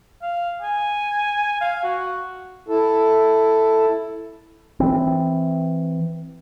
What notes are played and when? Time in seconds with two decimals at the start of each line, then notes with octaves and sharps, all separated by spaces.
0.23 F5
0.62 G#5
1.61 F5
1.84 F#4
2.68 E4 A4
4.80 E3 C4